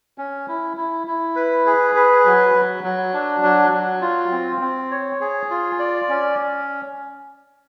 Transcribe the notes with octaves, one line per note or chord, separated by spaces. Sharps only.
C#4
E4
E4
E4
B4
G#4
B4
F#3
F#3
F#3
D4
F#3
F#3
F4
C4
C4
C#5
G#4
F4
D5
C#4